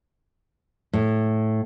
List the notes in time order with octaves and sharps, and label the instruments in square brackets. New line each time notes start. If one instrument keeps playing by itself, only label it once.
[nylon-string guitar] A2